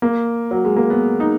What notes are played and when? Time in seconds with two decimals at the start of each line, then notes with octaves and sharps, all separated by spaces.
0.02 A#3
0.51 F#3
0.65 G#3
0.76 A#3
0.90 B3
1.20 D#4